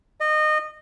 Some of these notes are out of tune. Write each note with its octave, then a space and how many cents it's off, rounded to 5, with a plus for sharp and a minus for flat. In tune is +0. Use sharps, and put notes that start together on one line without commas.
D#5 -25